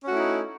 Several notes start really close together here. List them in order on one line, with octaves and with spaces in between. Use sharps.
C#4 F#4 A3 E4 D#4